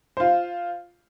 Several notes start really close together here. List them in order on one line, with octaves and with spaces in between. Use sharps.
C5 F4 F5